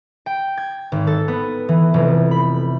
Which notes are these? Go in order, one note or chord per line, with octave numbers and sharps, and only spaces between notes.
G5
G#6
G#1
A4
B3
E3
F1
B5